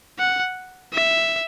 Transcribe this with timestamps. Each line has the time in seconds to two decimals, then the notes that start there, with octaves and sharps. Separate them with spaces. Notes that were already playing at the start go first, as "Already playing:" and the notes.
0.18 F#5
0.93 E5